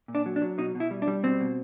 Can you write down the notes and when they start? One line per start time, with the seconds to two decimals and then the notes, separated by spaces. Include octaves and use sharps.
0.08 A#2
0.15 D4
0.26 F#3
0.36 D4
0.42 F#3
0.58 B2 D#4
0.75 B2
0.80 E4
0.91 G3
1.02 D4
1.08 G3
1.23 B2 C4
1.40 B2